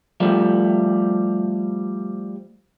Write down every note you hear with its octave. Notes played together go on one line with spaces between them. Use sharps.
F3 G3 A3